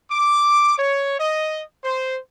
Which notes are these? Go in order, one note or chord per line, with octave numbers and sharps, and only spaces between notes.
D6
C#5
D#5
C5